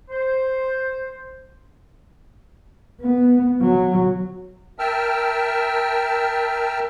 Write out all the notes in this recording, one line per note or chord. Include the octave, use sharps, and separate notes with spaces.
C5
B3
F#3
A#4 E5 G5 A5 E6 F6